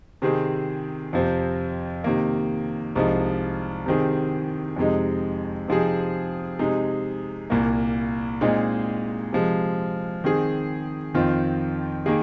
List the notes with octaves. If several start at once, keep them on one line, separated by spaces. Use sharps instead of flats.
C3 D#3 C4 G#4
F2 C3 F3 C4
C3 D#3 A#3
C2 C3 F3 G#3 D#4
C3 D#3 C4 G#4
F2 C3 G#3 D#4
C3 F3 C4 D#4 G#4
C3 G#3 D#4 G#4
C2 A#2 A#3
A#2 G#3 C4 D#4 G#4
C3 F3 G#3
D#3 C4 G#4
F2 D#3 C4 F4
D#3 A#3 G#4